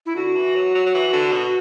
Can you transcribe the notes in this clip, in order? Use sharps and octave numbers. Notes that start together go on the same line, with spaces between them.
E4
D3 F#4
E3
F#3
F#3
F#3
E3
D3
B2